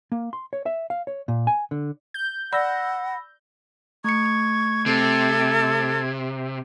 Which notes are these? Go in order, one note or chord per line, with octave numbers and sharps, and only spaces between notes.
A#3
C6
C#5
E5
F5
C#5
A#2
G#5
D3
G6
D5 F#5 B5 E6 A#6
A3 C#6 G#6 C#7
C3 A4